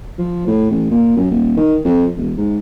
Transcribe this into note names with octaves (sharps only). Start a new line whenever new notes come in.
F3
A2
A1
A#2
F#2
D#1
D#3
F2
E1
G#2